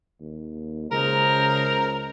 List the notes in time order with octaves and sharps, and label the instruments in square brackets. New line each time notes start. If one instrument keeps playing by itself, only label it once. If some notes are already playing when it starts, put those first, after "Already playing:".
[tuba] D#2
[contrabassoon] C#2 [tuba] C#3 [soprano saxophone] A#4 [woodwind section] C5 D#5 A#5